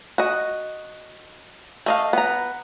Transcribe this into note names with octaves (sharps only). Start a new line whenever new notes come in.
F#4 D#5
A3 D#5 F5
B3 A#5